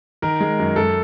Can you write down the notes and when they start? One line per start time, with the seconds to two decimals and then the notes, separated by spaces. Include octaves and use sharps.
0.22 D#3 A#4
0.40 G#3
0.59 F#2
0.76 F#2 A4